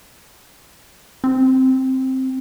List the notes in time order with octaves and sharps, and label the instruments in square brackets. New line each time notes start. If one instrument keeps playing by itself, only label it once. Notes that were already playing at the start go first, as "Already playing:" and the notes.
[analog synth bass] C4